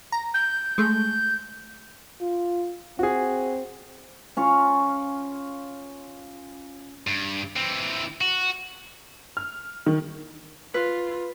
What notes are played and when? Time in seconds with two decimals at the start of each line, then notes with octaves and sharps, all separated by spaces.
0.12 A#5
0.34 G6
0.78 G#3 A3 G6
2.21 F4
2.99 C4 F#4 G#4
4.37 C#4 F4 C#5
7.07 G2
7.56 E3 C4
8.21 F#4
9.37 F6
9.86 D#3
10.74 F4 B4